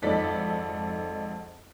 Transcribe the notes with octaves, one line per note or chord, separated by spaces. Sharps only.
G#1 F2 D#4 A4 D5 B6